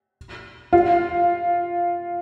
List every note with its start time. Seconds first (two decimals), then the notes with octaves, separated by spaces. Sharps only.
0.73 F4